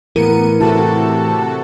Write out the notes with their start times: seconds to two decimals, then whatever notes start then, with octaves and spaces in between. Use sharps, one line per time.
0.16 A2 E3 B3 A#4 C#7 D#7
0.60 C3 E4 F#4 A4 A5